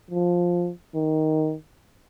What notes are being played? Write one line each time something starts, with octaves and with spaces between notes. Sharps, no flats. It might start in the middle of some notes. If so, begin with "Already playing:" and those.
F3
D#3